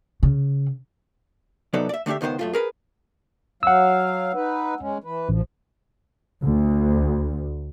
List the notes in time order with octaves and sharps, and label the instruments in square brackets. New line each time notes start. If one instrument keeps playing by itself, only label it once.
[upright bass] C#3
[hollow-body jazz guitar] C3 F#3 B3 D#4 A4 D5
D5 E5
D3 A3 D4 G4 E5
C#2 D#3 B3 B4 C5
F#2 A3 F4
G#4 A#4 B4
[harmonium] F#3 F5 [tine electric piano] F#5 E6
[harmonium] D#4 B4
G#3 C#4
E3 B4
[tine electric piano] A1 [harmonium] F3
[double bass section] D2